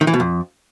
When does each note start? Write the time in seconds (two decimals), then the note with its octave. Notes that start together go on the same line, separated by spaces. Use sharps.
0.01 D#3
0.07 E3
0.14 B2
0.20 F2